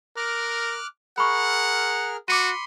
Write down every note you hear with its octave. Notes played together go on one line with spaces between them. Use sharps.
A#4 D6 F6 F#6
G#4 A#4 F#5 B5 C#6 F6
F#4 B5 C6 D6 C#7 D#7